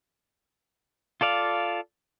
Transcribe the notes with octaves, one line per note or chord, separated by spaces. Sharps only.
F4 A4 D5 F5